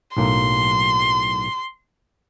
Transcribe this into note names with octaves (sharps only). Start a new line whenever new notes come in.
B1 A2 A#3 C6